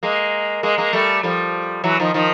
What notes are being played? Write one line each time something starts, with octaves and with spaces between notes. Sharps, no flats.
G#3 A#3
G#3 A#3
G#3 A#3
G3 A3
F3 G3
E3 F#3
D#3 F3
D#3 F3